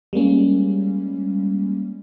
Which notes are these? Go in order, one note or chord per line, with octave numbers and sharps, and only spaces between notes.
G3 G#3 A#3 C#4